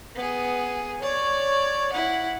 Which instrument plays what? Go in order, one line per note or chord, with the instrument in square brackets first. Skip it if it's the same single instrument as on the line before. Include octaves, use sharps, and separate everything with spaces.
[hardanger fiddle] B3 G#4
[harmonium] C#5 [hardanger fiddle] D5
[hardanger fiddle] E4 F#5